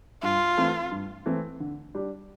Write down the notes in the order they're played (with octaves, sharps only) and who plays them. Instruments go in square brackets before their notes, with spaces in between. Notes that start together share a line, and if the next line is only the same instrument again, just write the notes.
[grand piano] G2 [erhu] F4
[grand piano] E3 A3 C4
G2
E3 A3 C4
D3
G3 D4 G4